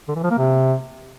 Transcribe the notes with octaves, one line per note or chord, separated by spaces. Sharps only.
D3
E3
F3
A#3
C3